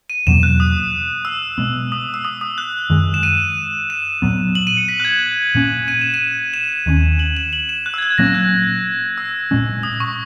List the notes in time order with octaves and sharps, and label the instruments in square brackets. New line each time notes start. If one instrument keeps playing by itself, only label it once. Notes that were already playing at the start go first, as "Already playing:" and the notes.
[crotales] D#7
[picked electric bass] E2 B2 F#3 A#3 [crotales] E7
[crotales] F#6
D#6
E6
[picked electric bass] B2 G#3 B3
[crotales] D#6
E6
D#6
D#6
F#6
[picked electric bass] F#2 D#3 G#3
[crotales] E7
D#7
E7
[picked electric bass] A#2 F#3 B3
[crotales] F#7
D#7
C#7
B6
F#6
G#6
[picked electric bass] A#2 A#3 C#4
[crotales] D#7
E7
D#7
E7
[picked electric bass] D#2 D#3 G#3 C#4
[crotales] F#7
E7
F#7
E7
F#6
E6
G#6
F#6
G#6
[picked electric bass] A#2 F#3 A#3 C#4 [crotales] A#6
[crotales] F#6
E6
[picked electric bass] A#2 G#3 C#4
[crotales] D#6
C#6